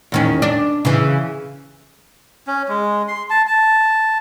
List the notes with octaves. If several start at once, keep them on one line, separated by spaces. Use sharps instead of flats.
E2 D#3 C#4
D4
C#3 E3
C#4
G#3
C6
A5
A5